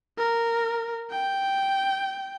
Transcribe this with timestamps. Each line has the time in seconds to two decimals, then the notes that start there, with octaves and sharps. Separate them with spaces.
0.18 A#4
1.11 G5